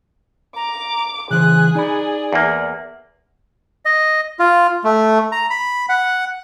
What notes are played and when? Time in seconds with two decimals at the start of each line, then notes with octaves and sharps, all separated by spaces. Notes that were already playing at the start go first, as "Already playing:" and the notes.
0.56 A#5 D6
1.31 C#3 E3 G#4 C5 F#6
1.75 D#4 D5 B5
2.33 E2 A#3
3.85 D#5
4.39 F4
4.84 A3
5.32 A#5
5.50 B5
5.89 F#5